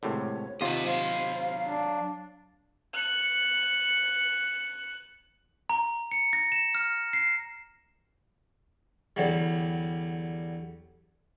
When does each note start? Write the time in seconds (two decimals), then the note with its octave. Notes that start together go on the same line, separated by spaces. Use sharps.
0.03 G#1 A2 C3 C#5
0.61 D#2 C3 F4 D#5 F#5
0.85 F#3 C5 D#5 F5
1.65 D4
2.94 F#6 C#7
5.70 A#5
6.12 C#7
6.33 A#6
6.52 E7
6.75 F6
7.13 C7
9.16 E2 D3 F#3 G3